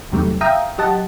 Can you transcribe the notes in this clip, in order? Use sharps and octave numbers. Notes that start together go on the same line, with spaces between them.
E2 C3 D#3 F#3 G3 A3
E5 F5 G5 A#5 D#6
F#3 G4 D#5 F#5 A5